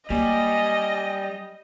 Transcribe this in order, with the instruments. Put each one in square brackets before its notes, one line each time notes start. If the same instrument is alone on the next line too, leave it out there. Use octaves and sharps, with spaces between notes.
[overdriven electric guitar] G3 [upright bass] A#3 C#4 [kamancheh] D#5 [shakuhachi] G#5